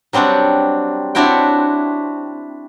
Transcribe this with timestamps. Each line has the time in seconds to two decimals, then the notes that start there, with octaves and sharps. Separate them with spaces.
0.13 F#3 G3 C4 D4 F#5
1.15 C4 D4 E4 F#4 C#5 G5